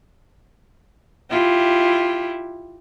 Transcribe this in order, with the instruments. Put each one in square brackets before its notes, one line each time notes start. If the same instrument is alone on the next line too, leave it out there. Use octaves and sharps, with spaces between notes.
[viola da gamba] E4 F4 G4